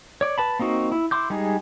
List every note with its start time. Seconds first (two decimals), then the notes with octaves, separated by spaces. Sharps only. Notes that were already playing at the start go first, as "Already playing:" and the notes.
0.21 C#5 D5
0.38 B4 A5 B5
0.59 A#3 C4 D#4 F#4
0.92 E4
1.11 E4 C6 D6 G6
1.30 G3 G#3 D#4 G#4